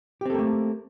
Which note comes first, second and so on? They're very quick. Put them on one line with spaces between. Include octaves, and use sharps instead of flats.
G4 C4 A4 A#3 A3